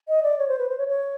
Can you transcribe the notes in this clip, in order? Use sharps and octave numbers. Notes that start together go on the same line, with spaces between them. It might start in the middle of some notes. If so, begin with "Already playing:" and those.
D#5
D5
C#5
C5
B4
C5
C#5
C#5